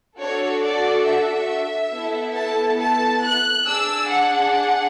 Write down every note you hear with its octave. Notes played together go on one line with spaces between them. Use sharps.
D4 F#4 A4 C#5
D5
E5
B3 E4 A4
A5
A5
F#6
D4 G#4 E6
F#5